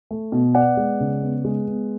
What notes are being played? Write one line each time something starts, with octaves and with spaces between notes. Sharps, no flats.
A3
B2
B3 D5 F#5
G#3
C#3
B3
G#3
B3